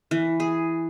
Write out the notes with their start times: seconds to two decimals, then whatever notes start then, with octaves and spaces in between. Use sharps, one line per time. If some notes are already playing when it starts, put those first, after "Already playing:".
0.11 E3
0.40 G#4